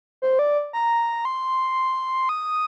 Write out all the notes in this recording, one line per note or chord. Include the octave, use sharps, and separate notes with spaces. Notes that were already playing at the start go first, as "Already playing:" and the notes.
C5
D5
A#5
C6
D#6